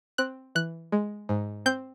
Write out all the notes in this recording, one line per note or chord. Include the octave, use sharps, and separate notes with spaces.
C4 F#6
E3 F#6
G#3
G#2
C4 G6